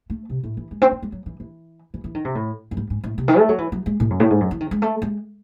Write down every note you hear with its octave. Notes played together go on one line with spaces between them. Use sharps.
A3
C3
A2
E3
G#3
C4
C#4
G#3
F#3
E3
E3
E3
E3
D#3
C3
A2
F#2
G#2
G#2
A2
C3
D#3
A3
F#3
E3
F#3
G#3
A2
F#2
A2
G#2
F#2
E3
D#3
G#3
A3
G#3